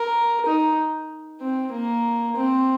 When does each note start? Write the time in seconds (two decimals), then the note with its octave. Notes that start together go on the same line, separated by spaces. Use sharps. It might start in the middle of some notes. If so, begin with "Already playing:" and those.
Already playing: A#4
0.46 D#4
1.41 C4
1.72 A#3
2.36 C4